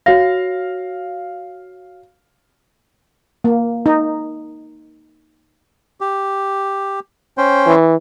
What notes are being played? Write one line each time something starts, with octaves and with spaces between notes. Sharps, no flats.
F#4 C#5 F5 A#6
A#3
D#4
G4
C#4 C5 G5
E3